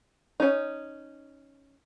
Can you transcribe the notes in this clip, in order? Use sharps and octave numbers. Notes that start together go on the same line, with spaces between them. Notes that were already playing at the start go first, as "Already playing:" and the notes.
C#4 D#4